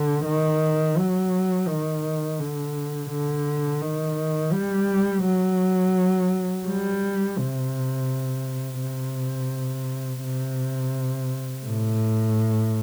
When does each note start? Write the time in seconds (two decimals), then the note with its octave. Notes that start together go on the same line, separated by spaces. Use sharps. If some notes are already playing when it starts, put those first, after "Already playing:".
Already playing: D3
0.25 D#3
0.97 F#3
1.68 D#3
2.40 D3
3.11 D3
3.81 D#3
4.53 G3
5.24 F#3
6.66 G3
7.38 C3
8.81 C3
10.23 C3
11.66 A2